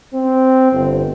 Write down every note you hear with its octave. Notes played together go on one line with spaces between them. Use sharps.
C4
G1